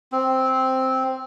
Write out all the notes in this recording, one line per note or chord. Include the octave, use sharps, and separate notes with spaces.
C4